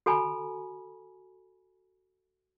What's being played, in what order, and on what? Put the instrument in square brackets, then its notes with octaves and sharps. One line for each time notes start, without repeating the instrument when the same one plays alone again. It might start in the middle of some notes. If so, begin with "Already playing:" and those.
[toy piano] F#4 A4 G#5 A#5 B5